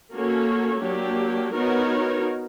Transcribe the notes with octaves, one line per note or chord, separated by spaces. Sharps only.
A#3 C#4 F#4 A4 C#5
F#3 A#3 D4 G4
B3 D#4 F#4 A#4 C#5